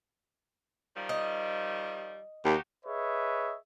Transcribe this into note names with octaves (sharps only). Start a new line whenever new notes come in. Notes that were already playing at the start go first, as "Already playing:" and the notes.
D#3 F3 G3
D#5
D#2 D#4 F#4 G4
G#4 B4 C#5 D#5 E5